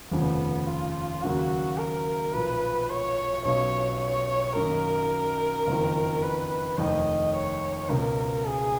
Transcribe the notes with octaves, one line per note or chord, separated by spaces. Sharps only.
F1 D#2 C#3 F3 B3
F4
D#2 C#3 F#3 A#3 F#4
A#4
B1 A#2 F3 B4
C#5
B1 B2 F#3 C#4 F4 C#5
C#5
F#2 D#3 A#3 A#4
F#1 F2 D#3
B4
F1 D#2 D#3 D#5
C#5
C#2 B2 A#3 A#4
G#4